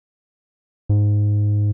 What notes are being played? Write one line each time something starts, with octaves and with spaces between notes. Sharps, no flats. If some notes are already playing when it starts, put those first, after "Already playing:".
G#2